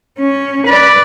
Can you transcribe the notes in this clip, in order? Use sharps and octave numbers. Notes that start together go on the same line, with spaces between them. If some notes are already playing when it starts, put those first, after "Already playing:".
C#4
B4 D5